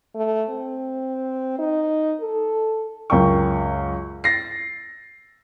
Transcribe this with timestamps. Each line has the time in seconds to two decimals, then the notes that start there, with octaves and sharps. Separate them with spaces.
0.15 A3
0.50 C4
1.59 D#4
2.21 A4
3.10 C#2 F#2 A#4 G5 C#6
4.24 A6 A#6 C7